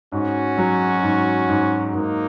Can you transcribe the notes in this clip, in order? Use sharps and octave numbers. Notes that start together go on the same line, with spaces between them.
G#2 C#4 F#4
F#3
G#2
G#2
G#2 A#3 D#4